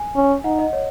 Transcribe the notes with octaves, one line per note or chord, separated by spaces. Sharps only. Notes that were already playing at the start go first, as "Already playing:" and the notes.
Already playing: G#5
C#4
D#4 F#5
D#5
C#5